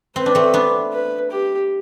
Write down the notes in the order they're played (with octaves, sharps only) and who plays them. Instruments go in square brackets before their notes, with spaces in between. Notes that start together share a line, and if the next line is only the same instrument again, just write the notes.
[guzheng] C4 [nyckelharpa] B4
[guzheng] D4
A3 C4
B3 D4
[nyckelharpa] B4
G4